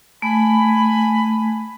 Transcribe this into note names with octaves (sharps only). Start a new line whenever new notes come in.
A3 G#5 B5